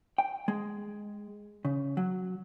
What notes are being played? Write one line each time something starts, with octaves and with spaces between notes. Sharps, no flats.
G5
G#3
C#3
F#3